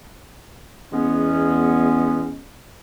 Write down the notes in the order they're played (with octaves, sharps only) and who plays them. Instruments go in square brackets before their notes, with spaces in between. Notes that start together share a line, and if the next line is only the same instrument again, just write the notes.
[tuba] E2 [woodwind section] G#3 B3 C#4